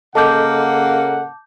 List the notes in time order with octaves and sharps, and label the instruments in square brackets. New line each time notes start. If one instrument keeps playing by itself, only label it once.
[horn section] C#3 A#3 F#5 [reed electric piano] A4 D#5 [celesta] A5 D6 G6